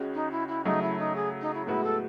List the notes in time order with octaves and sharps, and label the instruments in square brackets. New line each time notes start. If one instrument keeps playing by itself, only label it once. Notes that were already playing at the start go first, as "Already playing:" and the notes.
Already playing: [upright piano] C#2 C#3 G#3 C#4 F#4
[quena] D#4
E4
E4
[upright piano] C#3 F#3 A3 [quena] D#4
[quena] E4
D#4
G#4
D#4
E4
[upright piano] A2 G#3 B3 F#4 [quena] E4
[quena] A4